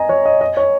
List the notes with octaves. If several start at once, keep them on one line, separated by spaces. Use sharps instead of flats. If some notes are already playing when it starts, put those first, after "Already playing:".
Already playing: D#5 G#5 A#5
C#5
D#5
D#5
C#5